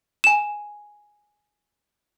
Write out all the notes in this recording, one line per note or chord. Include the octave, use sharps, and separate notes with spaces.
G#5 E7